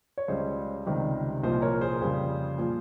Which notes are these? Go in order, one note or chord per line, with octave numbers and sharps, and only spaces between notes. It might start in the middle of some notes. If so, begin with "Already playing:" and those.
C#5
C#2 C#3 G3 C5 D#5
C#2 C3 D#3 G3
C2 A#2 F3 C5 D#5
A#4 C#5
G#4 C5
F2 C#3 G3
A#2 F3